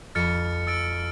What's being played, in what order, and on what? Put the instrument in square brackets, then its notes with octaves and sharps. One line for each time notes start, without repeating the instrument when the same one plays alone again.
[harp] F2 B5 [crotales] F6 A6 C#7
[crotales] E6 A6 D7